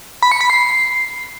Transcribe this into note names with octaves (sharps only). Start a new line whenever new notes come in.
B5
C#7
B5
C7